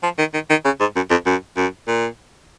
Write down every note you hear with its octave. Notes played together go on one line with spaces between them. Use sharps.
F3
D#3
D#3
D#3
C#3
G#2
F#2
F2
F#2
F#2
A#2